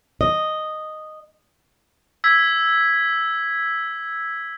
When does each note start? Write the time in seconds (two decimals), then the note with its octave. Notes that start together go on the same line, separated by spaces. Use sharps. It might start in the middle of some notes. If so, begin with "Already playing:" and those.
0.21 D#5
2.24 E6 G#6 B6